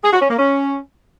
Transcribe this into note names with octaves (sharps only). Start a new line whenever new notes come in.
G#4
F#4
C#4
A#3
C#4